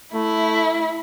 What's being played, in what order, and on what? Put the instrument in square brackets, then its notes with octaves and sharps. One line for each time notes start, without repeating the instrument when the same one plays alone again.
[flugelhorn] A3 [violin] E4